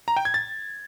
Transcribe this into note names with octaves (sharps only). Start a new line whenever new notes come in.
A#5
G5
G#6
A6